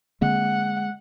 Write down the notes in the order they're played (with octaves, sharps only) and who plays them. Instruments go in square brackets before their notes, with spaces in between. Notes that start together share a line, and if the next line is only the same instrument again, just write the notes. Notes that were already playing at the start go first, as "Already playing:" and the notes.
[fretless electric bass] D3 A#3 C4 [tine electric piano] G#3 [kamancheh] F#5